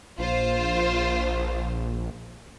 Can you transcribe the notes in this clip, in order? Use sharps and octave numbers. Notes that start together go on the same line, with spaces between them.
A#1 F4 C5